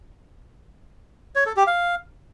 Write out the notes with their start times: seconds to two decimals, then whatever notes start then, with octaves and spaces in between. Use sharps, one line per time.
1.36 C#5
1.46 A4
1.56 G4
1.67 F5